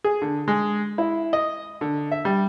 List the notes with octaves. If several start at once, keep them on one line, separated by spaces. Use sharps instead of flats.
G#4
D3
G#3
E4
D#5
D3
E5
G3